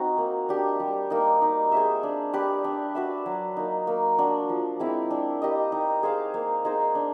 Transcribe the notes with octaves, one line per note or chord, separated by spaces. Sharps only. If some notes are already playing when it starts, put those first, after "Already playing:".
Already playing: C4 D#4 F#4
A#3
D4 G4
G3
A#3 D#4
D#4
G#4 C5 E5
D4
G4 B4 D5
D4
F#4 B4 E5
F#3
A#3 D#4
A#3
D4 F#4
F3
G#3 C4 E4
D4
G4 A#4 D#5
D#4
G#4 C5 F5
A#3
D#4 G#4 C5
D4